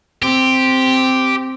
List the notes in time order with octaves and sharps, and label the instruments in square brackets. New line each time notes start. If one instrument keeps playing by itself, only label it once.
[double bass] C4 [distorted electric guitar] G4